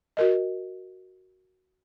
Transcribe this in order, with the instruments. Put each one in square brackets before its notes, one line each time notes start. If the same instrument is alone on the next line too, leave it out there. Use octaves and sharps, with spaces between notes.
[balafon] F#4 A#4 D#5